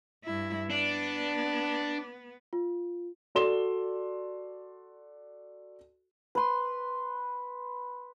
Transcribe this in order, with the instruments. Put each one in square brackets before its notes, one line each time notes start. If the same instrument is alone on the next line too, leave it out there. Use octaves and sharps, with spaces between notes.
[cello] G2 E4
[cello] B3 [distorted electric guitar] D4
[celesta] F4
[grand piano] F#4 A4 D5 C6 E7 G7
[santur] B4 C6